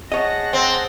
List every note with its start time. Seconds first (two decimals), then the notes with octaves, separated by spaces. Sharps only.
0.12 G#4 C#5 D#5 F#5 A5 A#6
0.53 C4